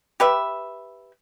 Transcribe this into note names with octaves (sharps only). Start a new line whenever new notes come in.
G4 B4 E5